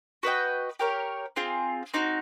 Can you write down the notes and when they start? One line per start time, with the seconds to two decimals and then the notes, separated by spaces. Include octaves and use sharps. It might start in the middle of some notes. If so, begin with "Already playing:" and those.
0.23 F#4 B4 D#5 G5
0.79 G4 A#4 C#5
1.36 C4 F4 G#4
1.94 C4 D#4 F#4